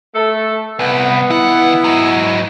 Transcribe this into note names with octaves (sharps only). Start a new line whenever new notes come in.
A3 A4
C2 B3 B4
D#3 E4 F#5
G#2 F#3